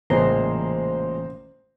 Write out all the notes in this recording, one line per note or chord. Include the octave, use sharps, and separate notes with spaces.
A1 A#2 C#3 G#3 C5 A#5 C6